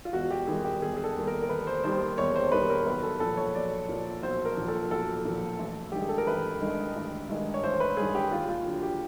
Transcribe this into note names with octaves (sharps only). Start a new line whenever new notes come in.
F4
E1 F#4
G4
D#2 D#3 G3 A#3 G#4
G4
E1 G#4
G#4
A4
D#2 D#3 G3 A#3
A#4
A#4
E1 B4
C5
D#2 D#3 G3 A#3 C5
E1 C#5
C5
D#2 D#3 G3 A#3 B4
A#4
B1 B4
A4
A#2 F3 A4
C#5
B1 D5
A#2 F3
B1 C5
A#4
A#2 F3
A4
B1 A4
A#2 F3
A1
G2 D#3 G#3 G4
G#4
A4
A#4
A1 B4
G2 D#3 G#3
A1
G2 D#3 G#3
C#5
A1 C5
B4
G2 D#3 G#3 G#4
G4
D#2 F4
F4
D3 F#3
G4